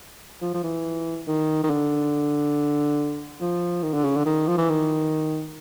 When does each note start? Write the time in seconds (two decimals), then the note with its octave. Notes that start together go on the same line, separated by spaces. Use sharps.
0.41 F3
0.54 F3
0.63 E3
1.27 D#3
1.64 D#3
1.70 D3
3.41 F3
3.83 D#3
3.93 D3
4.04 C#3
4.16 D3
4.25 D#3
4.47 F3
4.57 E3
4.69 D#3